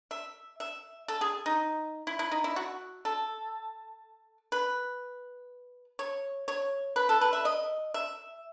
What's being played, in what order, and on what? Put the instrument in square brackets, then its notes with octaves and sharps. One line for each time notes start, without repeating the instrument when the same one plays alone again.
[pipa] E5
E5
A4
G#4
D#4
E4
E4
D#4
E4
F#4
A4
B4
C#5
C#5
B4
A4
B4
E5
D#5
E5